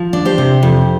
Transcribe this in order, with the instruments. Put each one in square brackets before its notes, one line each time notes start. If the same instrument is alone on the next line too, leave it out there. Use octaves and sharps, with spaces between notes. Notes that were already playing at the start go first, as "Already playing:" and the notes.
Already playing: [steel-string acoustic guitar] F3
D4
G4 C5
C3
F2